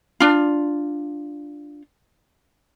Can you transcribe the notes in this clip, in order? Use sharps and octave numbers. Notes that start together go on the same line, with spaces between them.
D4 F4